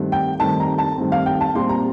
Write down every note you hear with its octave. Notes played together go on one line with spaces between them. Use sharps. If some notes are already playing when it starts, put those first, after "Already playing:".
Already playing: G2 D#3 A3 C4
G5
G2 D#3 A3 C4 A5
A#5
A5
G2 D#3 A3 C4
F5
G5
A5
A#2 G3 C4 C6
A#5